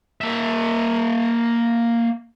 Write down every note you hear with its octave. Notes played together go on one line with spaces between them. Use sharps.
A#3 E5